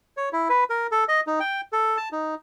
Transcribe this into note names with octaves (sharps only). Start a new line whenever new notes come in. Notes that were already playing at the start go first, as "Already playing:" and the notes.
C#5
E4
B4
A#4
A4
D#5
D#4
G5
A4
A5
D#4